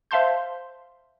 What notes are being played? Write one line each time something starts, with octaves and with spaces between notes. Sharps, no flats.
C5 E5 F5 A5 C6 G6